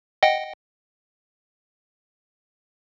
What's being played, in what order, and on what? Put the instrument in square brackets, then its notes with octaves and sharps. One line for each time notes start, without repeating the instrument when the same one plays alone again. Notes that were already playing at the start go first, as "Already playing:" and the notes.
[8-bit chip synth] D#5 F#5 G5